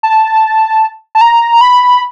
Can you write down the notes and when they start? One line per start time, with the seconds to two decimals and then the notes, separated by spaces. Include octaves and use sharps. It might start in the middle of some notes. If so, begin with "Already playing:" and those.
0.03 A5
1.15 A5
1.21 A#5
1.61 B5